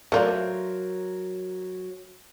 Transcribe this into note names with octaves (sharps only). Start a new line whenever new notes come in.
F#3 A3 F4 A#4 C5 D5